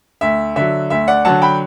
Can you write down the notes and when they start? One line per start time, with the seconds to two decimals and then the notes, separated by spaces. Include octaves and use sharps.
0.21 D2 E5
0.56 D3 F#3 E5
0.90 D2 E5
1.08 D5 F#5
1.25 D3 F#3 F#5 A5
1.42 G5 B5